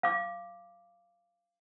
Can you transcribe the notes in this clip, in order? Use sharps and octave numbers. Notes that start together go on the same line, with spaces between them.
F5 D6